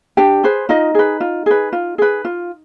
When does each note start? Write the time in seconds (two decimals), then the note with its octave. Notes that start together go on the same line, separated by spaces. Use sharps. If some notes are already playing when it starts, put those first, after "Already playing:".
0.17 D4 G4 G5
0.43 G#4 B4 C5
0.69 D#4 F4 D#5
0.95 G#4 B4
1.21 F4
1.46 G#4 B4
1.73 F4
1.98 G#4 B4
2.25 F4